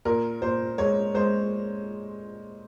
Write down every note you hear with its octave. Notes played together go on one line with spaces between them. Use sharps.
A#2 A#4
A#2 C5
G#3 C#5
G#3 C5